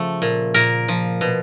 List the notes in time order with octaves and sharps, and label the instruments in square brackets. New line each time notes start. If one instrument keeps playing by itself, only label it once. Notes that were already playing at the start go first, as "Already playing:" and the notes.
Already playing: [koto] C#3 F3 A3
A#2
A#2 A#4
F3
B2